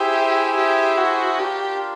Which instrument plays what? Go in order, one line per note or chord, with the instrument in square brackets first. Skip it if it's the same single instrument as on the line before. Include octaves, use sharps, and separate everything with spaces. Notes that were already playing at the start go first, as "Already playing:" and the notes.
Already playing: [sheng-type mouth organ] E4 G#4 C5 E5 G#5 [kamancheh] G4
[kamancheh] G4
F#4
[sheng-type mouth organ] D4 F4 A#4 [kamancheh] G4